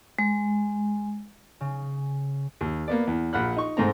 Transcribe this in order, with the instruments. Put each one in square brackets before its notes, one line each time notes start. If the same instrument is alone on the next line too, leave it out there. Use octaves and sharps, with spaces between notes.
[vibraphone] G#3
[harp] C#3
[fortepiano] D#2
A#3 B3 D5
E2
A#1 F#5 B5 F6 F#6
D#4 C#6
G#2 A3 C4 A#5